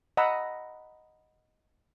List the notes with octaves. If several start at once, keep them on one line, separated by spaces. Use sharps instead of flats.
D#5 F#5 A#5 B5 E6